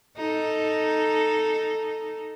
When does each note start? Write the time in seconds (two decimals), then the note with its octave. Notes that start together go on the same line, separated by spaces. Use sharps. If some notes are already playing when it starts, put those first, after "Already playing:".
0.17 D#4 A4